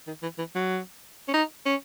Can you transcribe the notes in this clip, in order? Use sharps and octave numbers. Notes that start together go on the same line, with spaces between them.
D#3
E3
E3
F#3
C#4
D#4
C#4